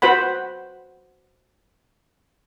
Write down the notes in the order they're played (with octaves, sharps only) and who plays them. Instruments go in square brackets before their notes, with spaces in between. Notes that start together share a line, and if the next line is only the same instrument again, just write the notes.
[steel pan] F#4 B4 C5 F#5 B5